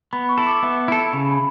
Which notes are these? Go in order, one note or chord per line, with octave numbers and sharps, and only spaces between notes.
B3 B5
C#6
E4 A4
D6
B3 E5
E4 A4
C#3 B5